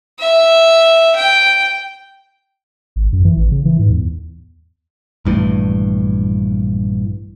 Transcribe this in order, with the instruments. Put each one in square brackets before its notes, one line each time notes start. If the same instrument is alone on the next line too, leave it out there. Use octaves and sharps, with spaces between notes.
[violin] E5
G5
[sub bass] G#1
F#2
E3
A1
C#3
E3
G#2
E2
[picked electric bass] A#1 G2 E3 A3